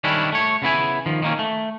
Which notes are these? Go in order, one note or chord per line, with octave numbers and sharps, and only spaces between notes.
D#3 G3 C#4 D4 E4
A3 C#5
C#3 B3 E4 G#5
D#3 F3
D#3 A#3 C#4
A3